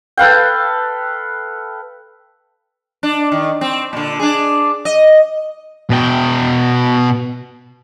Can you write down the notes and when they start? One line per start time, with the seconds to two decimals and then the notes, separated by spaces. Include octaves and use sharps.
0.17 A4 B4 F5 G5
3.03 D4
3.32 D#3
3.61 C4
3.93 A#2 D3
4.19 D4 G#4
4.85 D#5
5.90 B2 G5